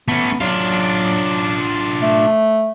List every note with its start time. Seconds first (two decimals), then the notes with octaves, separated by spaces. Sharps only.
0.08 A3 B3 C#4
0.41 F#3 D4 F4
2.02 A3